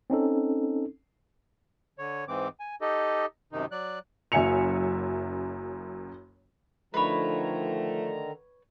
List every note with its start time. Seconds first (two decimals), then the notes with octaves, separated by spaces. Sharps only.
0.10 C4 C#4 D#4 A4
1.99 D3 C#5
2.28 G#2 E3 C4 D6
2.60 G#5
2.81 D#4 G4 A4 D#5
3.52 F#2 C3 D#3 D#4
3.71 F#3 D5 F#6
4.32 F#1 F#2 E5 G#5 C#7 F7
6.94 D3 D#3 F3 A3 B4 C#5 A#5